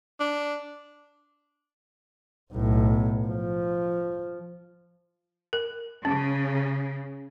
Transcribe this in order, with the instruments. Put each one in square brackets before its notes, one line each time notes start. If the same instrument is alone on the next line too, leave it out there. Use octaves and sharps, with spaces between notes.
[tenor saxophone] D4
[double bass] B1 A2
F3
[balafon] A#4
[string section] C#3 [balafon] C#4